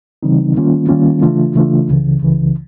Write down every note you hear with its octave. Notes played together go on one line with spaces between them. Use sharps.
C#3 E3 G3 C4 D#4
D#3 G3 A#3 C#4 F4
D#3 G3 A#3 C#4 F4
C#3 E3 A3 D4 F4
C#3 E3 A3 D4 F4
C#2 C#3 E3
C#2 C#3 E3